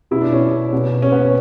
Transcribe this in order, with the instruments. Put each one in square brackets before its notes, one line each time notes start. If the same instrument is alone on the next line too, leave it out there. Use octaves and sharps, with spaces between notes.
[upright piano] B2 E4
D4
C#4
B2
C#4
B3
C#4